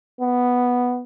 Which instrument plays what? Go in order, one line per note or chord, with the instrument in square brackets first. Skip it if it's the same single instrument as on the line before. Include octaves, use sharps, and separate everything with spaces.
[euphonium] B3